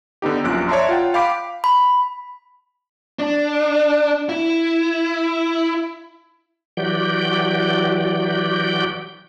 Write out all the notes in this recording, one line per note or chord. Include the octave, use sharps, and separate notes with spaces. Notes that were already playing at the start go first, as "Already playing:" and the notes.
D3 B3 D#4 G4
A#1 F#2 A#2 F#6 D7
C#5 D5 E5 A5 A#5 C6
F4 F#5 G5
F5 G5 B5 D6 B6 D7
B5
D4
E4
E3 F#3 F#4 G4 D5 G6